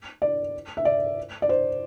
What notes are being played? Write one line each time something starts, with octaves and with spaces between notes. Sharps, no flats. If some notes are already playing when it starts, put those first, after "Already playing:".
D5
E5
D5
D5
C5